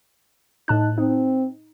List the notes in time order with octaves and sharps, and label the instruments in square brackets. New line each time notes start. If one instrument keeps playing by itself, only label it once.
[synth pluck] A2 A5 F#6 [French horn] D#4
[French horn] C4 [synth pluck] D#4